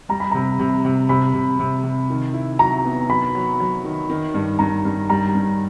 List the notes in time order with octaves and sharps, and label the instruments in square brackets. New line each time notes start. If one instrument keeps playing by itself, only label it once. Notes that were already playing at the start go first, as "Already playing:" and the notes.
[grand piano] G3 [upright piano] A#5
[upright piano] B5
[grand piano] C3 [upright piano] A#5
[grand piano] C3
C3
[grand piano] C3 [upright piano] B5
[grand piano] C3
C3
C3
D#3
E4
[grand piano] F#3 [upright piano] A#5
[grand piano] B3
[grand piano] F#3 [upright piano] B5
[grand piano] F#3
F#3
D#3
D#3
G2
[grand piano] G2 [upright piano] A#5
[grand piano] G2
[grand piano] G3 [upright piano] A#5
[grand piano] G2